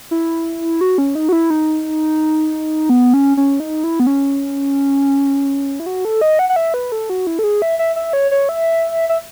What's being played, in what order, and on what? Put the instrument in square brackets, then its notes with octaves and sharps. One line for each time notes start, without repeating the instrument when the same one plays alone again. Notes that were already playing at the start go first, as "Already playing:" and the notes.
[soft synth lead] E4
F#4
C#4
D#4
F#4
E4
D#4
B3
C#4
C#4
D#4
E4
B3
C#4
E4
F#4
A4
D#5
F#5
F#5
E5
B4
A4
F#4
E4
A4
G#4
E5
E5
E5
C#5
C#5
E5
E5